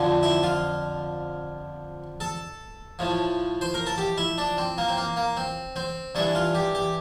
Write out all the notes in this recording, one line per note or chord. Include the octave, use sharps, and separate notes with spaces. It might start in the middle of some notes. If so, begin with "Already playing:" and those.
Already playing: F2 D3 F3
E4
F4
A4
A2 F3
C5
A#4
A4
G4
E4
D4
C4
A#3
C4
A#3
A#3
C4
C4
G2 E3 D4
F4
G4
G4